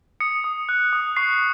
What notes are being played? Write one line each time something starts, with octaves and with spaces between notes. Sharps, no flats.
D#6 C#7
D#6
F#6
D#6
C#6 C7